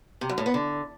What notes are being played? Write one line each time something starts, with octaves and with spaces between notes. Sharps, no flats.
C3
F#2
A2
B3
D3